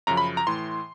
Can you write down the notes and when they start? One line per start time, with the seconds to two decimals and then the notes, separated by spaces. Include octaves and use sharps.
0.07 F#2 C#3 F3 A#5
0.17 B5
0.37 A#5
0.47 A2 E3 C6